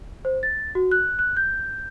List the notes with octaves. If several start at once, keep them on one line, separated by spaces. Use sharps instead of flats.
C5
A6
F#4
F#6
F#6
G6